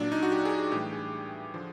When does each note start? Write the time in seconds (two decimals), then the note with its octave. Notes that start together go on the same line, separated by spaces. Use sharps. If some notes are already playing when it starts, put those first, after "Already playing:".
Already playing: A#2 F#3 D4
0.12 D#4
0.23 F#4
0.32 G4
0.45 G#4
0.58 G4
0.72 A2 E3 G3 G4
0.93 G#4
1.54 D3 F3